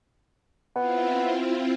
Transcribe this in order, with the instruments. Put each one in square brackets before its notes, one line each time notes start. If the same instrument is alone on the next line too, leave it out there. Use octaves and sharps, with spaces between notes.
[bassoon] B3 [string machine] C4 E4 F4